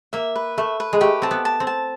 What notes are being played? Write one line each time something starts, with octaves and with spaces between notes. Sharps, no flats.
A#3 E5
B4
A3 E5
B4
G#3
A3 G4
C4 A5
B3
A5
C4
A5